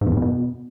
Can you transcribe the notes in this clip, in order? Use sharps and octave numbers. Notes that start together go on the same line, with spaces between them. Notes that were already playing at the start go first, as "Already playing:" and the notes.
G#2
E2
G2
E2
B2